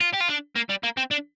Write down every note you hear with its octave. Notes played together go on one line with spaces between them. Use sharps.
F4
G4
F4
D4
A#3
G3
A#3
C4
D4